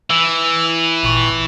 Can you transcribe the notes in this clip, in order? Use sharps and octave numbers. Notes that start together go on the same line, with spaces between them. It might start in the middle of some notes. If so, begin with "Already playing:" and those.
E3 E6
G#1 A#2 C#6